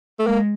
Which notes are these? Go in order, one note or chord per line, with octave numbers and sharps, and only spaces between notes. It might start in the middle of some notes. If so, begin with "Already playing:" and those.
A3
G#3 A#3